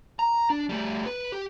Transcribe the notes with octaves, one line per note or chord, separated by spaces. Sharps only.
A#5
D4
G3 A3
B4
G4